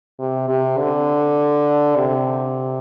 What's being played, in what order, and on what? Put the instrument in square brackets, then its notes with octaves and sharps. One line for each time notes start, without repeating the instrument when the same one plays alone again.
[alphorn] C3
C3
D3
C3